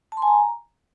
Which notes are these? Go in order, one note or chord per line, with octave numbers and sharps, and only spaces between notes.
A5
C6
G#5
A#5